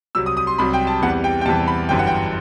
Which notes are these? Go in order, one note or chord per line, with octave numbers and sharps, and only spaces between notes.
C2 C3 F#3 E6
D#6
D#6
C6
C2 C3 F#3 B5
G5
A5
E2 C3 E3 G3 F#5
G5
G5
E2 C3 E3 G3 A5
B5
G1 F#2 E3 G3 G5
F#5
G5